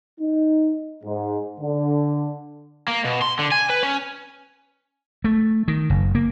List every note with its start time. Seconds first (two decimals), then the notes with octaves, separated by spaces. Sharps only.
0.20 D#4
1.04 G#2
1.60 D3
2.88 A#3
3.05 B2
3.22 C6
3.39 D3
3.52 G#5
3.70 B4
3.83 C#4
5.24 A3
5.68 D#3
5.90 F#1
6.15 A#3